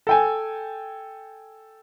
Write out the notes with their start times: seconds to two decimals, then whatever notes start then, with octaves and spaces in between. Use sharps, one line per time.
0.07 A4 G5 G#5